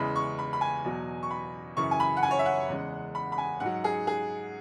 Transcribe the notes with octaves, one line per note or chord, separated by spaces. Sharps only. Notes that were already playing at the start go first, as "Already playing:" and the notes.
Already playing: E2 C#3 E3 G#3 B5
C#6
B5
B5
G#5
E2 B2 F#3
C#6
B5
F#2 C#3 E3 C#6
G#5
B5
F#5
G#5
C#5
E5
F#5
E2 C#3 G#3
B5
B5
G#5
G#2 F#5
F#3
G#4
G#4